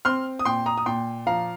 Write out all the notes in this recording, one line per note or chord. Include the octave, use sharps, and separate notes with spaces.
C4 C6 F6
D#6
A#2 G5 C6
A#5 D#6
D#6
A#2 G5 C6
F3 F5 A#5